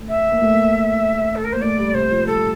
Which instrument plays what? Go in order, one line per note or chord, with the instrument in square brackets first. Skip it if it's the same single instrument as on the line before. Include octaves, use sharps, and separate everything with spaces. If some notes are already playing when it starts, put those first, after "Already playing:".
Already playing: [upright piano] A3
[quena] E5
[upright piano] A#3
A3
A#3
[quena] A4
A#4
[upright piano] A#3 [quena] C5
[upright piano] A3 [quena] D5
[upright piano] G3
[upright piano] C3 [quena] C5
[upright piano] F3
[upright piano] G3 [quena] A4